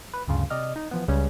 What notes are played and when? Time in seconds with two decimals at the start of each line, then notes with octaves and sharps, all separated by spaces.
0.14 B4
0.28 D2 G2 C#3 F4
0.50 C3 D5 D#5 F6
0.76 D#4
0.91 E3 F3 B3
1.08 C#2 C#3 G3 C#4